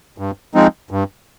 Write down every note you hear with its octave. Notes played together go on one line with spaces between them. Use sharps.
G2
F3 G#3 C4 D#4
G2